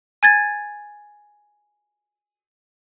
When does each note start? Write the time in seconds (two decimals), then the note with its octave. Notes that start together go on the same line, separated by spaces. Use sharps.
0.23 G#5 G#6 A6